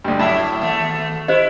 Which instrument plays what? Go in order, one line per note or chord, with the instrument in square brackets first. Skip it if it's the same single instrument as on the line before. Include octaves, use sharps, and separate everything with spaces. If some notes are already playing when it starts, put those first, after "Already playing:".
[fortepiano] D2 G2
[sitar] A2 F#3 E4 [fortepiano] E5 A5 [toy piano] B5 D6
[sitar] D#2 A3
[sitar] E4 [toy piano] G4 C5 D#5